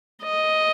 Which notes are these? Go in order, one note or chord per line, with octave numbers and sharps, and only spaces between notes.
D#5